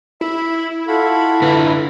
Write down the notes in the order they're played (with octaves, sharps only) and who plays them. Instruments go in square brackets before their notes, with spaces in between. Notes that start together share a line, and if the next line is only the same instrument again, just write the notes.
[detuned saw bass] E4 [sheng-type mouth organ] E5 B5
[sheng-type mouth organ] F4 F#4 B5 [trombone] A4
[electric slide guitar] D3 B4